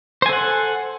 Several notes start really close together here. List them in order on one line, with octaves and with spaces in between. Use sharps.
C5 G#5 A4 F#5